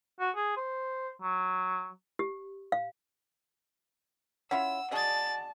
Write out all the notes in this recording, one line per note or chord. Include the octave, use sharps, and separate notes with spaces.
F#4
G#4
C5
F#3
G4
F5
C#4 E4 F4 F#5 E6
F#4 G#4 D5 D#5 A5 A6